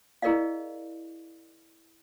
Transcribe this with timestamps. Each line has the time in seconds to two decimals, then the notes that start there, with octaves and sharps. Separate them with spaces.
0.22 E4 G#4 A#4 D5 D#5 F5